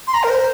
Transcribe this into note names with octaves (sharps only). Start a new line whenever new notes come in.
C6
A#5
A#4
C5